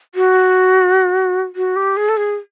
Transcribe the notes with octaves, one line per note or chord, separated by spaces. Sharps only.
F#4
F#4
G4
G#4
A4
G#4